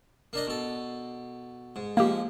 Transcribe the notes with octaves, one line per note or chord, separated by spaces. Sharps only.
A#3 D4 D#5
B2 A4
G#2
F3 G#3 A#3 G4